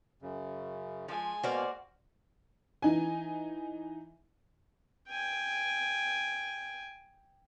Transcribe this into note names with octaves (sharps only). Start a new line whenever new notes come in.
F#2 C#3
F3 G#3 G#5
B2 A#3 F#4 C5 D5 F5
E3 D#4 G#5
G5 G#5